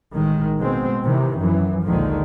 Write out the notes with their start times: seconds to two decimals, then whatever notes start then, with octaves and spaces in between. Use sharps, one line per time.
0.14 A1 D#3 G#3
0.58 B2 G#3 C4
1.04 C3 D#3 E3
1.39 F#2 E3
1.85 A#1 D#2 D3 D#3 F3 G#3